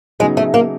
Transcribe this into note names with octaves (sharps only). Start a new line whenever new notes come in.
C#3 F#3 G#3 B3 D#4 G#4
A3
A#3